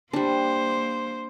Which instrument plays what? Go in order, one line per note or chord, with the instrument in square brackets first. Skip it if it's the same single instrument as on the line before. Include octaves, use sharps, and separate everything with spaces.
[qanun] G3 D4 [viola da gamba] A#3 C5